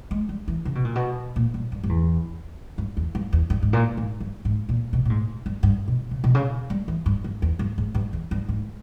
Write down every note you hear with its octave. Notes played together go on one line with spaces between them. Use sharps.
G#3
G3
E3
C#3
B2
A#2
B2
A#2
G2
G2
G2
E2
G2
E2
G2
E2
G2
G#2
A#2
G#2
G2
G#2
A#2
B2
A#2
G#2
G2
G2
B2
C#3
B2
C#3
G3
E3
G2
G2
E2
G2
G#2
G2
E2
G2
G#2